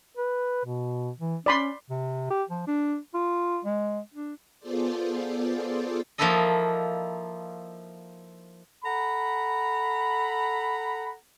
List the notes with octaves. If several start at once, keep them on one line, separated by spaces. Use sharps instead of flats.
B4
B2
E3
C#4 D5 B5 C6
C3
G4
F3
D4
F4
G#3
D4
B3 F4 G#4 A4 C5 D5
F3 A#3 D#4 E4 A4 D#5
A4 F#5 A#5 B5